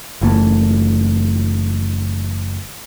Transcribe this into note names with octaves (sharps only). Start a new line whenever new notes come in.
F#1 E3 A3